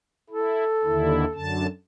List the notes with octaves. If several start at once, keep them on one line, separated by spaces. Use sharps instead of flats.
E4 A4
D#2 D3 E4
F#2 D3 A5